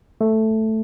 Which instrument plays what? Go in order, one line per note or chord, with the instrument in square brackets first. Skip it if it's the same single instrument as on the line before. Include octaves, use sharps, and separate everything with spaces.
[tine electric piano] A3